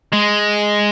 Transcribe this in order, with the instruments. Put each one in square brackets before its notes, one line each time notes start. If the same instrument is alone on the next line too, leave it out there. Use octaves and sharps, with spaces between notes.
[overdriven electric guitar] G#3